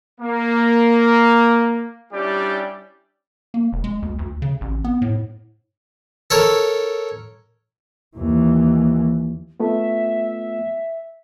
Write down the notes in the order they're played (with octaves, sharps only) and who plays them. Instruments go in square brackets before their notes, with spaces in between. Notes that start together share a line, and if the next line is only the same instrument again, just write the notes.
[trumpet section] A#3
G3 C#4 D4 E4 G4 D5
[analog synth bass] A#3
E1
G#3
D2
D2
C#3
A1
B3
A2
[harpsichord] A4 A#4 C#5
[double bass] D#2 E3
[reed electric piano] A3 B3 F4 [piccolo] E5